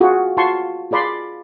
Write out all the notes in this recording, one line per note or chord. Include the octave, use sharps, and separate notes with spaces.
F4 F#4 G#4
F4 F#4 A5 C6 C#6
F4 G#4 D5 B5 C6